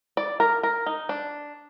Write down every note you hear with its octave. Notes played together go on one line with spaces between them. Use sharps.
D5
A#4
A#4
D#4
D4